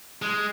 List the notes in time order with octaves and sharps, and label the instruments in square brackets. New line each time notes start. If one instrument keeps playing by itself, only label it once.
[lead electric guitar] G#3